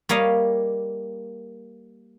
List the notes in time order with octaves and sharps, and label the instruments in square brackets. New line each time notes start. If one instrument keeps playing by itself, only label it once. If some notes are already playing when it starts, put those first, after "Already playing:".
[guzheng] G3 A#3 C#5 D#5 F5